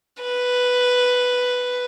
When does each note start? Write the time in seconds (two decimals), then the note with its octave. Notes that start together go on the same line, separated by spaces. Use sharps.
0.23 B4